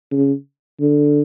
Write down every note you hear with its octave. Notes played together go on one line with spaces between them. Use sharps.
C#3
D3